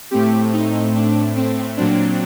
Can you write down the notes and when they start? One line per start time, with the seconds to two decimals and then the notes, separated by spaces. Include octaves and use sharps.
0.11 A2 A3 C4 G4
0.53 D#4
0.94 D4
1.36 C4
1.77 A#2 F#3 C4 D4